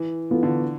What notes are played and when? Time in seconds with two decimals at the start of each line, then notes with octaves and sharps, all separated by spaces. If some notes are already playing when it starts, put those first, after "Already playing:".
Already playing: E3
0.30 E3 B3 F4 A4
0.43 D3